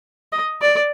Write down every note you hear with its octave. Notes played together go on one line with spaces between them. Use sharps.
D#5
D5